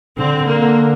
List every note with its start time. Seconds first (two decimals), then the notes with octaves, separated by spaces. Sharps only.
0.18 D3 C4
0.46 D3 A#3